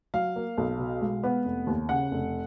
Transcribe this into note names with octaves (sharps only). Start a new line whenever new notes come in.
F#3 F5
A#3
B1
B2
G#3
B3
F1
D#2
C#3 F#5
F1